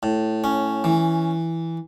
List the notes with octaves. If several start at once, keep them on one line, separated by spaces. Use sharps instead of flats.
A2
C#4
E3